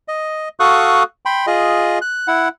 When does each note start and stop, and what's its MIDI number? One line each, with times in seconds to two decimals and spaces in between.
0.08 0.49 75
0.60 1.03 66
0.60 1.03 69
0.60 1.03 77
0.60 1.03 85
0.60 1.03 87
0.60 1.03 90
1.26 1.46 79
1.26 1.46 83
1.26 1.46 84
1.47 1.99 65
1.47 1.99 68
1.47 1.99 75
2.01 2.27 90
2.28 2.48 64
2.28 2.48 78